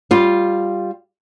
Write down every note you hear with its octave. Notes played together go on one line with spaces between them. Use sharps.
G3 F4